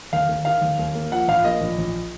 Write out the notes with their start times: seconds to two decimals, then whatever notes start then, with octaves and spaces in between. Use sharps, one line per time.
0.13 D#2 F5
0.29 D#2
0.45 D#3 F5
0.61 D#2
0.79 D#2
0.95 A#3
1.12 F3 F#5
1.28 A#1 F5
1.44 A#3 D#5
1.61 A#1
1.78 A#1